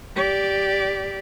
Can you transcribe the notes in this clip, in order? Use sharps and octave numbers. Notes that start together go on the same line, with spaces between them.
G4 D5